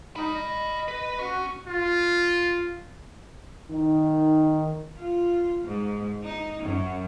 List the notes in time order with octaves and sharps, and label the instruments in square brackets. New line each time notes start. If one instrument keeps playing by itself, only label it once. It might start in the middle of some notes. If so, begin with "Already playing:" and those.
[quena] D#4 [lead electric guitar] D5 B5
[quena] D#5
[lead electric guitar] B4
[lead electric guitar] C#4 [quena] F#4
[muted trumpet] F4
[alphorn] D#3 [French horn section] D#4
[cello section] F4
G#2
D#4
F#2